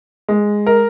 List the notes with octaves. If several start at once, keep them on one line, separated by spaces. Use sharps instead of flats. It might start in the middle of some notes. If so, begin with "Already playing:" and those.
G#3
A#4